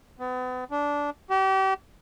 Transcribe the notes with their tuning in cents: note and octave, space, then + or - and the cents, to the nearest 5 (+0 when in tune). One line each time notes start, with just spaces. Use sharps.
B3 +40
D4 -15
G4 -35